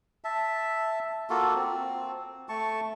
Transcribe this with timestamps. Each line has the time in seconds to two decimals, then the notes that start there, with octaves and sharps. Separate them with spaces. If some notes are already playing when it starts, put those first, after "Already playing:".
0.24 E5 A5
1.30 A#3 F4 F#4 A4
1.55 C4
2.49 A3 A5 C#6